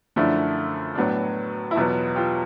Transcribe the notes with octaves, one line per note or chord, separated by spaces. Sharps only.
F#2 D3 F3 A3 D4 E4
A2 F#3 B3 D4
E4
E2 B2 F#3 B3 F4
F4 G4